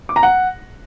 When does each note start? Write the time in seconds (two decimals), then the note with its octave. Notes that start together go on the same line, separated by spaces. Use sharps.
0.09 D6
0.16 A#5
0.23 F#5